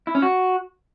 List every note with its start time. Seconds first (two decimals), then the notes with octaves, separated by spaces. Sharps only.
0.07 E4
0.15 C#4
0.22 F#4